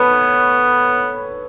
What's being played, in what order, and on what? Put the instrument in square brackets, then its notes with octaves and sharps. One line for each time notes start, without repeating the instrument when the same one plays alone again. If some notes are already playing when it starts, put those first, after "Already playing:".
Already playing: [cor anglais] B3 [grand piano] A4 B4 C#5